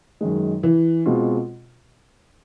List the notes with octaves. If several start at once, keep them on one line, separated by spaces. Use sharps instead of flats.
F#2 D#3 G#3
E3
B2 G#3 C4 F4